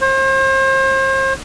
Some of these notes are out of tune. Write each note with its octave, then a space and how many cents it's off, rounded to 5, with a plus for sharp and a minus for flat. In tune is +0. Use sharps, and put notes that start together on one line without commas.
C5 +35